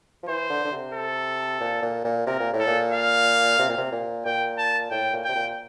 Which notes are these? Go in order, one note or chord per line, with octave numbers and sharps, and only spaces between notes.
F3
E3 C5
D3
D3
C3
A4
A#2
A#2
A#2
C3 A#4
A#2
A2
A4
A#2
F5
C3
A#2
C3
A#2
A#2 G5
A5
A2 G5
A#2
C3 G5
A#2